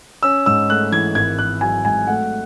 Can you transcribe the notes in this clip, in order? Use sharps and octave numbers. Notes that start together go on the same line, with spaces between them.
C#4 E6
G#2 E6
A3 F#6
E3 G#6
G#1 G#6
G#1 F#6
F#3 G#5
G#2 G#5
A3 F#5